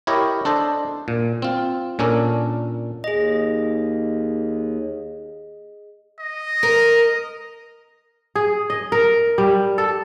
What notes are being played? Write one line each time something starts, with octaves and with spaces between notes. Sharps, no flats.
E4 G4 A#4 C#5 D#5
D4 A4 C5 D#5
A#2
C4 F4
A#2 C#4 D4 A4 A#4
D#2 G#4 D#5
D#5
A#4
G#4
D#5
A#4
G3
A4